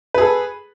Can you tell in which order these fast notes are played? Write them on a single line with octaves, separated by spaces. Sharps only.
B4 G#4 A4